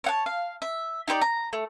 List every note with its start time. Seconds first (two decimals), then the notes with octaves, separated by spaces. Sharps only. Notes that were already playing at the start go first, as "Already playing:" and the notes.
0.04 C#5 F#5 A5
0.26 F5
0.62 E5
1.08 D#4 G4 C5 D5
1.21 A#5
1.53 A3